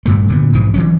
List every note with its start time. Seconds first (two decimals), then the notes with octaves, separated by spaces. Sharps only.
0.06 G2 A#2 A3
0.28 A#2 D3 B3
0.53 B1 G#2 E3 F3
0.74 E3 F#3 C#4